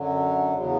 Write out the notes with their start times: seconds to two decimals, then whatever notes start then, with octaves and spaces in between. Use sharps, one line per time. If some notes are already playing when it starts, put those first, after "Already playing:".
Already playing: F#2 D3 F#3
0.54 E2 C#3 F#3